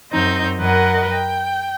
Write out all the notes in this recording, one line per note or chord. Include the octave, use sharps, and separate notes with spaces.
F#2 C4 D#4 G6
F#2 A#4 B4 D#5 F#5
G5